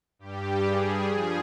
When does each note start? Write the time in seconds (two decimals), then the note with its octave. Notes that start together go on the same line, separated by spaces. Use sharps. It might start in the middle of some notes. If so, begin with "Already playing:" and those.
0.19 G2 G3 G4
0.64 G#4
1.08 G2 F3 G#4